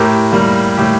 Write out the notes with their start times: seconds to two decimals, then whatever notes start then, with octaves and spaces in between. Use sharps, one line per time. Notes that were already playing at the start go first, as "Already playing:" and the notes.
Already playing: A2 G4 A#4
0.32 G3 A#3
0.78 A2 G4